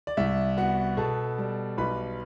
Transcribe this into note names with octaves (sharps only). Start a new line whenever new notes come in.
D5
C2 E5
B3 F#4 F#5
B2 A4 A5
G3
B1 B4 B5